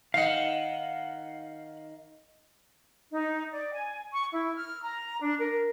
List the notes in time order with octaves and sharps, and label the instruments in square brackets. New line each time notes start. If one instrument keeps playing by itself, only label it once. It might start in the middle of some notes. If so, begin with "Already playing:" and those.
[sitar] D#3 D#5 [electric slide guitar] F5 F#5
[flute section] D#4
D5
G#5
C#6
E4
F6
A#5
D4
A#4